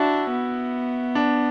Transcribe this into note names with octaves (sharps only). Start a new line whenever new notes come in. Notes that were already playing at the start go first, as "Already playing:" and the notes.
Already playing: D4 E4 F#4
B3
D4